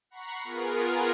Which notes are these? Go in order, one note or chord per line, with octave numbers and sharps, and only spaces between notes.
F#5 A#5 B5 C#6 C7
B3 F4 G#4 A#4